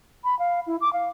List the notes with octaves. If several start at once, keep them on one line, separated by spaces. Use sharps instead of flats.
B5
F5
E4
D6
F5